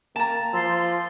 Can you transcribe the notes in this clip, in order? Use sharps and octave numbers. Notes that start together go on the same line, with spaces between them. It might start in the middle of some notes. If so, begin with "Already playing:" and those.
A#3 G5 A5 A#5 A6
F3 C6 E6 A6 C7